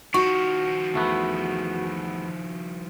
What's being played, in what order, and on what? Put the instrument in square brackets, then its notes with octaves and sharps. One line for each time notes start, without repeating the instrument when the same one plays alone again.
[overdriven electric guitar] D#3 F3 [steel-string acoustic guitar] F#4 [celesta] C#6
[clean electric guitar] E2 A3 B3